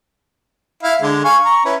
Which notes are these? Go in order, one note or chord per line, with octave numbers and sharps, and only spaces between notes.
E4 F5
D3 G#3
F5 G#5 C#6
A#5 C#6
C#4 E4 B4